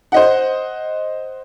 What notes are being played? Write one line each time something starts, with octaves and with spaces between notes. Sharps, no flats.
C5 D#5 F#5